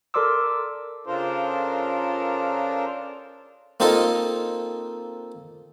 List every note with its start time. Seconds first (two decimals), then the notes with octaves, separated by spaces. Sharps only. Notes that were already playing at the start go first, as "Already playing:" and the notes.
0.14 A4 A#4 D5 C6 D6 E6
1.07 C#3 D4 F4 A4 A#4 C5
3.80 A#3 C4 D#4 F4 A4 D#5